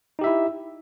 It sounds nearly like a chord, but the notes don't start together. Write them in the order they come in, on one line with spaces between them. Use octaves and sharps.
D#4 G4 E5 E4